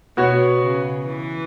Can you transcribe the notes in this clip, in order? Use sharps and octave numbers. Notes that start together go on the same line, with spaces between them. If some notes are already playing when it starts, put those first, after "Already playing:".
B2 B3 F#4 C#5
C#3
E3